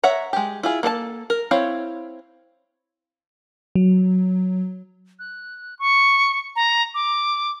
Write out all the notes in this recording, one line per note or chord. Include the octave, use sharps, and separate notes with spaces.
C#5 E5 F#5 A#5
G#3 G4
E4 F4 G#4
A#3 A4 B4 A5
A#4
C4 E4 C#5 F5
F#3
F#6
C#6
A#5
D6